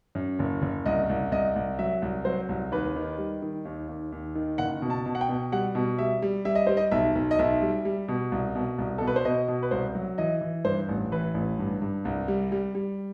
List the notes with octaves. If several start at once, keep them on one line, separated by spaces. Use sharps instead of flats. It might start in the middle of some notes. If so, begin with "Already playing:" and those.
F#2
F#1
F#1
C2 D#5
C2
C2 D#5
C2
F#3 E5
C2
F#3 C5
C2
D#2 B4
D#3
G3
D#3
D#2
D#2
D#2
D#3
F#1 F#5
B2
A5
B2
F#5
G5
B2
G3 F#5
B2
G3 E5
G3
G3 E5
D#5
G3 C5
D#5
B1 E5
B1
D#5
B1 E5
G3
G3
B2
C2
B2
C2
B2 A4
B4
C5
B2 D#5
B2
B4
C2 C5
F#3
E3 D#5
E3
G2 C5
A1
E3 B4
A1
G2
G2
C2
G3
G3
G3